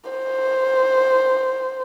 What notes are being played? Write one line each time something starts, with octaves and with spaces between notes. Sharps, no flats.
C5